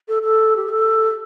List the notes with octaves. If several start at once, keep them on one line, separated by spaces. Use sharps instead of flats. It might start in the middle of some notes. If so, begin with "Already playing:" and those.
A4
A4
G4
A4